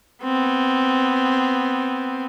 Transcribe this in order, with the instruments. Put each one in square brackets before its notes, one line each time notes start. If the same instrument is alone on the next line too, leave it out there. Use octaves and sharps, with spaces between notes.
[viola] B3 C4